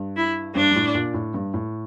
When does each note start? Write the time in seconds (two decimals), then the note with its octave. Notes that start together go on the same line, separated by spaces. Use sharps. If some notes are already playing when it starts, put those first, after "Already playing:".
Already playing: G2
0.16 E4
0.55 G2 D4
0.71 G2
0.76 A2
0.95 A#2
1.14 A2
1.34 G2
1.54 A2